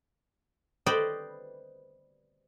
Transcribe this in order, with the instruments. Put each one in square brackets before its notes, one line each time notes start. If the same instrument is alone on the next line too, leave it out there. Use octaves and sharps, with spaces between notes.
[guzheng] B4 C5 D5 D#5 G5 B5